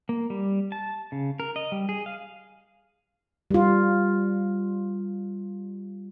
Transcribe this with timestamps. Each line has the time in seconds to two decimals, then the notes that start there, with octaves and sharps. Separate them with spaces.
0.09 A#3
0.30 G3
0.72 A5
1.12 C#3
1.40 A#4
1.56 D#5
1.72 G3
1.89 G#4
2.06 F5
3.51 G3 F4